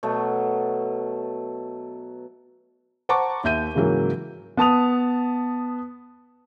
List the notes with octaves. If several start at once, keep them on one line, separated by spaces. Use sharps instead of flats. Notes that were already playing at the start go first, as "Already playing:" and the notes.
B2 F#3 A3
C5 F#5 A5 A#5 C#6 D6
D#2 E5 G6 D#7
G#2 C#3 E3 F#3 A#3
B3 A5 D#6 F7